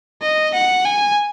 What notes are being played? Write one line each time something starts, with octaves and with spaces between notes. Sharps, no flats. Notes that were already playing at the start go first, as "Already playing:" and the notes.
D#5
F#5
G#5